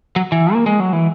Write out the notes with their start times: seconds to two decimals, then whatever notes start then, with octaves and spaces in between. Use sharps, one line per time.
0.16 F#3
0.32 E3
0.53 A#3
0.66 G#3
0.80 F#3
0.93 E3